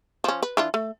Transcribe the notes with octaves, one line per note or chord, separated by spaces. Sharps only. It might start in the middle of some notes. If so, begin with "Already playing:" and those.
F3 C#4
B4
E3 D4 F4
A3